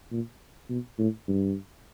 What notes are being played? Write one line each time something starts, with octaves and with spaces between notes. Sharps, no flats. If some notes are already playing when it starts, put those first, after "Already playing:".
A#2
B2
A2
G2